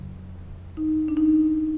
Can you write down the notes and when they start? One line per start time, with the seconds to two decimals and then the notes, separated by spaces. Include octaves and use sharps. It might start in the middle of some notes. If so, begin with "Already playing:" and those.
Already playing: F2 C#3 F#3
0.77 D#4
1.08 D4
1.17 D#4